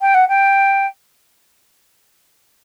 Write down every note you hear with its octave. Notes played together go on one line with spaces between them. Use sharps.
G5
F#5
G5